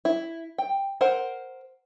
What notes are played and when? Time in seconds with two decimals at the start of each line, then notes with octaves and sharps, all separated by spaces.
0.05 E4
0.58 G5
1.01 A#4 C5 F#5